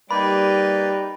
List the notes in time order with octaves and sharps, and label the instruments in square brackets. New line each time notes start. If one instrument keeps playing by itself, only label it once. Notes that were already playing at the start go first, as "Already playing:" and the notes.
[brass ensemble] G3 [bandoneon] A#3 B4 D5 [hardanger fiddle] D#4 G5 [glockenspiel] B5